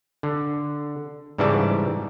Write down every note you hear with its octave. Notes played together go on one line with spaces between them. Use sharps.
D3
G#2 C#3 E3 G3 D5 A5